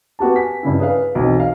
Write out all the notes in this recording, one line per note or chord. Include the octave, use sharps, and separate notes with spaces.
B3 F#4 G4 A5
G#5 B6
G2 C#3 E4
G#4 B4 F5
B1 E2 C4 B4
F5